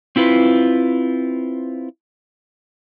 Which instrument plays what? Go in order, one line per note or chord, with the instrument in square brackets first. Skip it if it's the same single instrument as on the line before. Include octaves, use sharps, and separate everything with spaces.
[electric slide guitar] C4 E4 F4 B4